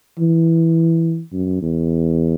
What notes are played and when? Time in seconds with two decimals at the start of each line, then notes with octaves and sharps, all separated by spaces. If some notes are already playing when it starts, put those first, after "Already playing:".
0.19 E3
1.32 F#2
1.62 E2